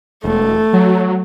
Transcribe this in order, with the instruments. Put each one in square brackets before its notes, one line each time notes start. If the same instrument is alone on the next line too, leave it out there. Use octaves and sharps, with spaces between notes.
[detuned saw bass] E1 [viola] A3
[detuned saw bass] F#3